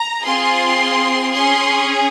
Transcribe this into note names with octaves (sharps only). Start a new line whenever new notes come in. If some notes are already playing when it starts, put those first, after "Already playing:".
Already playing: A#5
C4 F4 G#4 C6
C#4 G#4 C6